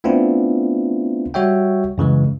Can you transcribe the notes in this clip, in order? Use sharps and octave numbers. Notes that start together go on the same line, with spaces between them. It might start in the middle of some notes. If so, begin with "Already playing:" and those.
A3 B3 C4 D4 E4 F4
G3 F#4 C#5 E5 G5
F#2 C#3 E3 G#3